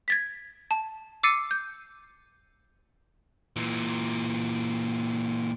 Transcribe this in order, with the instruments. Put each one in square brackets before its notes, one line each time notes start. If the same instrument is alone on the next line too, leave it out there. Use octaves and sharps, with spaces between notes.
[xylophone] G#6 A6 B6
A5
D6 E6 A6 C7 C#7 D#7
G6
[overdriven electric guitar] A#2 E3